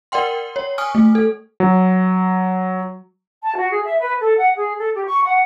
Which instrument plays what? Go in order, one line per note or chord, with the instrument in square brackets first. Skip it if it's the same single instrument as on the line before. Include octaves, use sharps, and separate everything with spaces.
[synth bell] A#4 D5 F#5 G5 C6
C#5
G#5 C#6 D#6 F6
A3
A4
[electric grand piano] F#3
[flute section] A5
F#4
G#4
E5
B4
A4
F#5
G#4
A4
G4
C#6
F#5